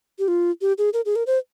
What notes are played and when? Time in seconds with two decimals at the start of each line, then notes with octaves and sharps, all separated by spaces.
0.19 G4
0.28 F4
0.61 G4
0.78 G#4
0.93 A#4
1.06 G#4
1.16 A#4
1.27 C5